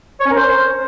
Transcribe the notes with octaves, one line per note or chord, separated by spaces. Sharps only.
C#5
C#4
A#4
C5